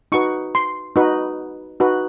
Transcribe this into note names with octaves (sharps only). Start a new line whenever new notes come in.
D#4 F#4 B4 C#6
C6
D#4 F#4 B4
D#4 F#4 B4